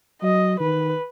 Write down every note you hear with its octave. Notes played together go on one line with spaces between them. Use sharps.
F#3 D#5
D#3 B4